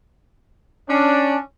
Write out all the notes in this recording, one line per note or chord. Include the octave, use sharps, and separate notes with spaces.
C#4 D4